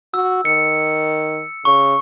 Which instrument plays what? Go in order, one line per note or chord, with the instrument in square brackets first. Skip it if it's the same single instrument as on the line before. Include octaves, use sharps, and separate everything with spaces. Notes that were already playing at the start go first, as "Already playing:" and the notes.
[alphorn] F#4 [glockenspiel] E6
[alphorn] D#3 [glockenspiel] C#7
[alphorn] C#3 [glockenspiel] C#6